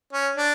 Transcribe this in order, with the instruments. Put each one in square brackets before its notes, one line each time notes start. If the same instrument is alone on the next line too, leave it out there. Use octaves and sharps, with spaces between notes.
[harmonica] C#4
D4